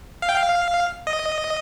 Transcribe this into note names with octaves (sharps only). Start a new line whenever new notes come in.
F5
G5
F5
D#5